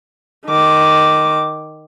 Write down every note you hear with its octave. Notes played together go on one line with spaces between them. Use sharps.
D#3 D6